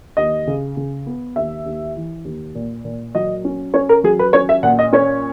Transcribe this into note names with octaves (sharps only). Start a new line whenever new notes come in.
D#2 D#5
C#3
C#3
B3
D#2 E5
D#2
E3
D#2
A#2
A#2
F#3 D#5
C#4
C#4 C#5
A#4
F#3 G#4
B4
C#4 C#5
E5
A#2 F#5
D#5
C#4 C#5